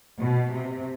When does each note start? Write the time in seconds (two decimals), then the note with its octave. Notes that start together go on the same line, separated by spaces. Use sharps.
0.19 B2
0.52 C3